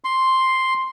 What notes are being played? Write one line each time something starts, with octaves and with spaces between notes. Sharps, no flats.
C6